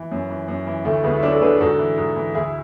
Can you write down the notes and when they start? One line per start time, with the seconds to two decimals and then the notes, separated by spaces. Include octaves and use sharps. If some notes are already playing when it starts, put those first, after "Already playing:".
Already playing: E3
0.11 F#2
0.30 E3
0.48 F#2
0.67 E3
0.85 D2 A3
1.04 D2 G#3 B3
1.16 E4
1.23 F#3 D4 F#4
1.32 A4
1.41 D3 G#4 B4
1.55 G#4
1.60 G#2 F#4 A4
1.79 E3
1.97 G#2
2.16 E3
2.34 D2 E4 G#4